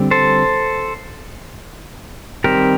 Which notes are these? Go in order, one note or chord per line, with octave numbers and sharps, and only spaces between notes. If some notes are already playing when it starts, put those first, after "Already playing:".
Already playing: D3 G3 C4
A4 C5
D#3 G3 C4 G4 A#4